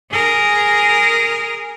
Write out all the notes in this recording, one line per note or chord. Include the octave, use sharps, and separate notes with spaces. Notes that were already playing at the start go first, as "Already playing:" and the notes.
G#4 A#4